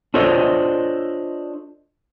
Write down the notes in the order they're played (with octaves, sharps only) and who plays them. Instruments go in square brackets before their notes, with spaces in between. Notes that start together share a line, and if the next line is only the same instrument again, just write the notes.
[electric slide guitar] D4 F4 A4 C5 C#5 D#5